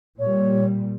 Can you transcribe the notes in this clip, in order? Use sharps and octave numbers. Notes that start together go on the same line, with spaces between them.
A#2 G3 C#5